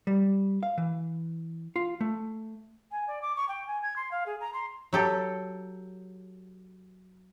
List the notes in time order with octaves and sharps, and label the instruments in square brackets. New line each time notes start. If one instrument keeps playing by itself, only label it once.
[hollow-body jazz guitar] G3
F5
E3
F4
A3
[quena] G#5
D5
D6
C#6
G5
G#5
G#6
C6
F5
G#4
A#5
C6
[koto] F#3 G4 A4